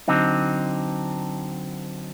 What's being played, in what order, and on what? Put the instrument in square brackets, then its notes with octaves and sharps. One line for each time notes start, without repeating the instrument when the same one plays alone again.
[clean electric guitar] D3 F#3 C4 D#4